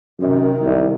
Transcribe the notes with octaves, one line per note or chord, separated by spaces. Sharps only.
F#2 C3 D#3
C2